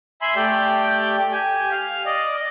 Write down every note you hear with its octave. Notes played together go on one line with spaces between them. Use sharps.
E5 G#5 B5 C6
A3 G4 D5 G5
G4 G#5
F5
D5 D#5